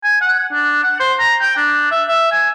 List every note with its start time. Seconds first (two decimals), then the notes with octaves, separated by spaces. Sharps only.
0.03 G#5
0.21 F#5
0.53 D4
0.83 F#5
1.00 C5
1.19 A#5
1.41 G5
1.56 D4
1.91 E5
2.08 E5
2.31 G#5